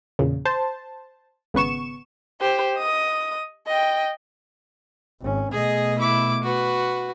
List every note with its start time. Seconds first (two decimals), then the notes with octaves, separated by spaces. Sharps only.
0.19 E2 A#2 C#3
0.45 C5 A5
1.54 G#1 C#3 B3 C#6 E7
2.41 G4 C5
2.77 D#5 D#6
3.67 D#5 G5
5.21 G#1 C#4
5.51 B2 A3 G#4 D#5
5.99 E4 D6
6.43 F#4 B4